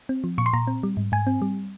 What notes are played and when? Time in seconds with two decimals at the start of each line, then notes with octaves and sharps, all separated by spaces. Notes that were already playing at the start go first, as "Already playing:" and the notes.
0.09 C4
0.24 F3
0.38 A#2 C#6
0.46 C6
0.53 A#2 A#5
0.67 C4
0.83 G3
0.97 G#2
1.12 G#2 G#5
1.27 C4
1.42 G3